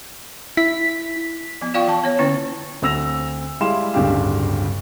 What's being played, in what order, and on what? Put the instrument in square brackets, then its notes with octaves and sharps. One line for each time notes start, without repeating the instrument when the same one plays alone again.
[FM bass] E4 [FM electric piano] B6
[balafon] F3 B3
F4 D5 F5 G5 C#6
E3 A5
B3 C#5
D3 A#3 C#4 E4
[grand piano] D2 C4 E6 A#6 F7
G3 G#3 E4 F5 C6 E7
D1 G2 C#3 D4 G4 F5